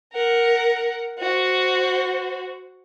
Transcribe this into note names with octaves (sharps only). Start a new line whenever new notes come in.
A#4 F#5
F#4 C5